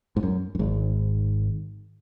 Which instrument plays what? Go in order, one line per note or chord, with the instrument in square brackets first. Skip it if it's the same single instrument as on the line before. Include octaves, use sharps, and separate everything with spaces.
[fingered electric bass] G#2
F#2
F#2
G#1 G#2